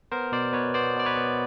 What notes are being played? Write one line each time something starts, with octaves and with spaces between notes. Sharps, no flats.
B3 A#4 C5
B2 C5 D5
B2 B4 C#5
B3 C5 D5
B2 D5
B4 C#5
B3